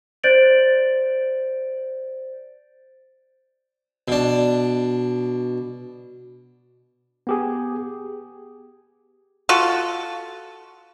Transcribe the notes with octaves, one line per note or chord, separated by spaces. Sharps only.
C5 D5 G6 A6 D7 F#7
B2 D4
B3 G4 G#4
F4 F#4 A4